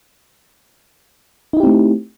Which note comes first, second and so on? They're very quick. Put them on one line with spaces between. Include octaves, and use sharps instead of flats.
D#4 E4 G4 C4 A3